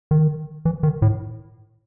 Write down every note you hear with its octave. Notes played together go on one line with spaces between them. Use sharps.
D#3
E3
D#3
A2